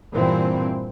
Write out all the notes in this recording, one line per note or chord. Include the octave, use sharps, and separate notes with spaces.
G2 A#2 E3 C4